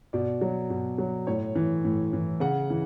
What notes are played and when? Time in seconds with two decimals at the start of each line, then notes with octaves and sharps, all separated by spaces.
0.13 B2 D5
0.41 F#3
0.70 B2
0.98 F#3
1.27 A2 C#5
1.55 E3
1.84 A2
2.13 E3
2.40 C#3 F#5
2.70 E3